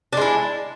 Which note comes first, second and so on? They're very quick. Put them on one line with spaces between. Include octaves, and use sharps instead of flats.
D4 G#3 E4